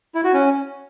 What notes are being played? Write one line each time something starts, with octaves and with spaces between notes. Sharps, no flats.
E4
F#4
C#4